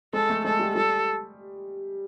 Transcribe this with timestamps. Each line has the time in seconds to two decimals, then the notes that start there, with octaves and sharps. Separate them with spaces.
0.13 G#3 A4
0.30 A3
0.45 G#3 A4
0.59 G3
0.76 G3 A4